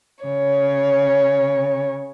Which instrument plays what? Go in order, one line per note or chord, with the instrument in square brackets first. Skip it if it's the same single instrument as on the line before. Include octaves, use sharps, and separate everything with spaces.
[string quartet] C#3 C#5